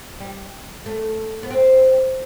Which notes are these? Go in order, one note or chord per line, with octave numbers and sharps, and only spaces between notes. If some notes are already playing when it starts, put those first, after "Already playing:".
G3
A3
B3
C4